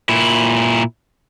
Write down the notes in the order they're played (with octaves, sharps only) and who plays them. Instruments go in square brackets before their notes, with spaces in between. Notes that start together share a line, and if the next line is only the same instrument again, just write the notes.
[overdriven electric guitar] A#2 E4